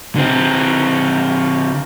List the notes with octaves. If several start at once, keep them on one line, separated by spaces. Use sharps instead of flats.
D3 C4